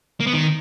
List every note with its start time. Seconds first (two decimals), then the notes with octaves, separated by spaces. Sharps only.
0.20 A#3
0.27 B3
0.33 D#3